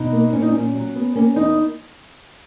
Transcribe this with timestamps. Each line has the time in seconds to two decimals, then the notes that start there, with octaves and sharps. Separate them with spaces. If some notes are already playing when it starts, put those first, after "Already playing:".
Already playing: B2 D#4
0.12 A#3
0.33 A#2 C#4
0.42 D#4
0.52 A#2 C#4
0.74 F#3
0.95 B3
1.15 A#3 C#4
1.36 E2 D#4